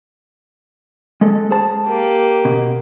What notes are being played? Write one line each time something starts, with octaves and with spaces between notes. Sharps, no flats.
G#3 A4
G#4 C5 A5
A#3 G4
B2